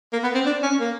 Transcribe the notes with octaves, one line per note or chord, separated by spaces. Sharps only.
A#3
B3
C4
D4
C#4
A#3